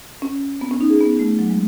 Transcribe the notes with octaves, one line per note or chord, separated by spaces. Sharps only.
C#4
B3
C#4
D#4
G#4
B3
A3
F#3
G#3